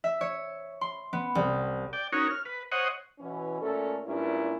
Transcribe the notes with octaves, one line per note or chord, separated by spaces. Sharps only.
E5
C#5
C6
B3
C2
D5 G5
C#4 D#4 F#4 A#4 C#5
F6
B4
C5 C#5 D#5 F#5
B2 E3 C#4
A#2 A3 C#4 A4
G2 A#2 G#3 A#3 C#4 E4